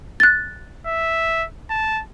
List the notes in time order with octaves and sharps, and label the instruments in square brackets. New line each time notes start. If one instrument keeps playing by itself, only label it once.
[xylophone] F#6 A6
[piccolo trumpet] E5
A5